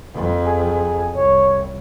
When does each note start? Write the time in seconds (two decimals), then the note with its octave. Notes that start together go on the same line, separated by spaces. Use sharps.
0.15 F2
0.46 G#4
1.15 C2 C#5